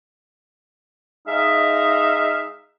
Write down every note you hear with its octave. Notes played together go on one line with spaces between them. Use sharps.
G#3 D#4 E5 F5